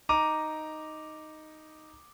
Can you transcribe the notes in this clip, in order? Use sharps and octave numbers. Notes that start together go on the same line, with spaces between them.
D#4 A#5 D6 D#7